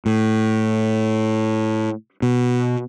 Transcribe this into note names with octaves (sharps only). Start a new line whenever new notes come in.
A2
B2